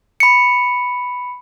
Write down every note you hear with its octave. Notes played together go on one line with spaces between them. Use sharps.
B5 C#7